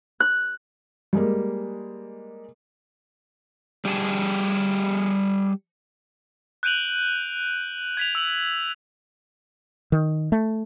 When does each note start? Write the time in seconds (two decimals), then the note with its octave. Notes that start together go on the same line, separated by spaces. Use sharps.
0.20 F#6
1.13 G3 G#3 A#3
3.85 G3 G4 G#4 G5 A5
6.63 F#6 G6 D7 D#7 F7 F#7
7.97 G#6 B6 F7
8.15 E6 F#7
9.92 D#3
10.32 A3